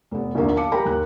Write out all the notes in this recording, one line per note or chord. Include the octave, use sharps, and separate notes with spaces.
F1 B3
A#1 D#2 D3 A#3 B3
F5 A5 D6 C#7
G4 A#4 G5 G#5 A#5 B5
D#2 F#6